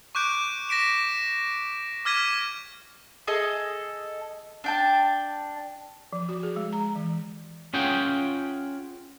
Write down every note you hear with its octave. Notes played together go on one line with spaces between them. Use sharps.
C#6 D6 F#6 G6 D7
A#6 B6 D7 E7
D6 F6 G#6 B6 D#7
G#4 A4 D#5
D4 G5 A5
F3
F#4
G#4
G#3
A#5
E3
C#4 F4 G#4 F#5 G5